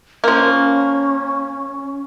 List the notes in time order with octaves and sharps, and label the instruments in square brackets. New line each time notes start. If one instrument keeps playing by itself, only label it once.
[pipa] F3 A#3 [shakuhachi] C#4